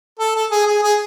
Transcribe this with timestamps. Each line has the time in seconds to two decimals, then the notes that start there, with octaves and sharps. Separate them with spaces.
0.19 A4
0.35 A4
0.51 G#4
0.67 G#4
0.83 G#4